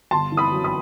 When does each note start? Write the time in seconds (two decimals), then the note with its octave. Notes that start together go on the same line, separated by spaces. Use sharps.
0.11 G1 A5 C6
0.32 E3
0.37 B5 D#6
0.51 F#2
0.64 B5 D#6